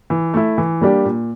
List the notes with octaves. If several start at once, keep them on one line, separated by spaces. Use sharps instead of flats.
E3
A3 E4
E3
G3 A#3 D4 G4
A#2